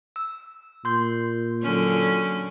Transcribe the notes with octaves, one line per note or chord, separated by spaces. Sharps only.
E6
A#2 C6 G6
D3 F#3 C#4